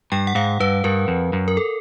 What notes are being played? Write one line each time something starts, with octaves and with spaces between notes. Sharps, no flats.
G2 G5
F#5
G#2 F5
G2 B4
G2 A#4
F2
F#2
A#4
A4